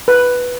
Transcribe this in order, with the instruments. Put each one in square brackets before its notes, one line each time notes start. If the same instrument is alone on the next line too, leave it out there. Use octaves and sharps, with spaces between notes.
[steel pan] B4